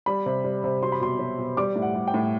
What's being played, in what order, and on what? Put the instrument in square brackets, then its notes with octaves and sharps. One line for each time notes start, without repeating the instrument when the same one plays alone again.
[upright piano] G3 B5
C3
G3
C3
F#3 C6
B5
B2 C6
F#3
B2
G3 D6
A2
F#5
G3
G5
A2